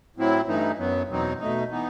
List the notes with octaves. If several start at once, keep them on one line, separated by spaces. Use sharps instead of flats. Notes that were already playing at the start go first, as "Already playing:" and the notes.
A2 F#3 C4 E4
G2 E3 A3 D#4
F#2 F#3 B3
E2 B2 F#3 C4 D#4
B2 A3 D#4
E3 B3 D#4